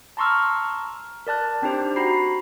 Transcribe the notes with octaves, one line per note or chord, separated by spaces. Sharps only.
A5 A#5 C6 C#6 E6 F6
A#4 D5 A5 F#6
C4 D4 D#4 G4 C5
F#4 A#5 B5 C7